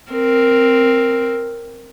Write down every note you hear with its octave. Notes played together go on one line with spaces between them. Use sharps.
C4 A#4